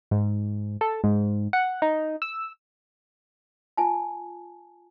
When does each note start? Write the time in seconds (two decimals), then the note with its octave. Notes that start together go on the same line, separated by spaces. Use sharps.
0.11 G#2
0.81 A4
1.04 G#2
1.53 F#5
1.82 D#4
2.22 E6
3.77 F4 G#5 A5